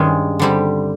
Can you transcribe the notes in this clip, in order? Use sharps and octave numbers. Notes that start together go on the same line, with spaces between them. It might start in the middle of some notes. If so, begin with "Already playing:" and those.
Already playing: G2 D#3 G#3 C#4
D3 G3 C4 E4 G4